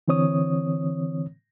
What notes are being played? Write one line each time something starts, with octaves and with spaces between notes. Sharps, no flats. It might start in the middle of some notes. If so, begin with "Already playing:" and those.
D3 E3 C4 C#5 D#6